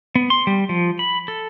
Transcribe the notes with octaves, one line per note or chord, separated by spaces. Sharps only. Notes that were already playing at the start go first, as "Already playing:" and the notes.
B3
C6
G3
F3
B5
A4